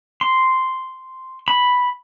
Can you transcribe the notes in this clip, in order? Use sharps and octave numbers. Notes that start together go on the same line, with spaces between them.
C6
B5